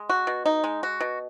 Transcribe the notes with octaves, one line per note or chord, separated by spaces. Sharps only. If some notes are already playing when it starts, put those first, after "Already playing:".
Already playing: G#3
F#4
B2
D#4
G#3
F#4
B2